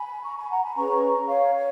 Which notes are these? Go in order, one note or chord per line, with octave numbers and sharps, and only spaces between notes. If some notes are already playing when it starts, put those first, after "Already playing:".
Already playing: G#5 B5
A#5 C#6
G#5 B5
F#5 A#5
G#5 B5
C#4 G#4 B4 A#5 C#6
C#5 F5
C#5